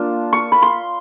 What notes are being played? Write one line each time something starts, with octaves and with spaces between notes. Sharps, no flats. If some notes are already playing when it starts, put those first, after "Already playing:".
Already playing: A#3 D4 F4
C#6
B5
C6